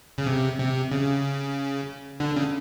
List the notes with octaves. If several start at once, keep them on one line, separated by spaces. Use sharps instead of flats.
C#3
C3
C3
C#3
D3
C#3